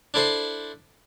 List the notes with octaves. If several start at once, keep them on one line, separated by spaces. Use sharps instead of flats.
D4 E4 A4 C5 C6